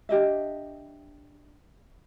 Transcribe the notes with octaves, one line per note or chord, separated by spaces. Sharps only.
D4 G4 D#5 E5